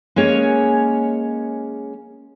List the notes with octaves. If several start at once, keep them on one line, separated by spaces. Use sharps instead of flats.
G#3 A#3 C#4 G#4 C#5